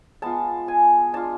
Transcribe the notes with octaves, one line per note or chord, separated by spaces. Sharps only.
G#3 B3 F4 A5
G#5
G#3 D4 F4 A5